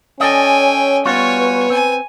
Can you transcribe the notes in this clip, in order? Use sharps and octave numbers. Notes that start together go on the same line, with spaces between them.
C#4 A4 D5 D#5 G5 G#5
C#5
G3 B3 F4 F#4 C#5 G#5
B4
C4 G#5